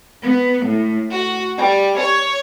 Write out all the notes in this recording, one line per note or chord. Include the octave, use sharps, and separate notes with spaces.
B3
A2
F#4
G3
C#5